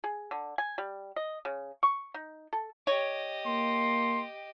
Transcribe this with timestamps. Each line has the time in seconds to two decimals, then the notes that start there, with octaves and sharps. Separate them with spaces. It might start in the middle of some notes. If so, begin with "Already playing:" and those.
0.04 G#4
0.31 D3
0.58 G#5
0.78 G3
1.16 D#5
1.45 C#3
1.83 C#6
2.14 D#4
2.53 A4
2.87 G4 C#5 D#5
3.46 A#3 C6